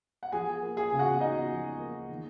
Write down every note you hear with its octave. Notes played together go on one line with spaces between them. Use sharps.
F#5
F3 G#4 G#5
A#3
G#4 G#5
C#3
F#4 F#5
D#4 F4 D#5
F3
A#3
D#3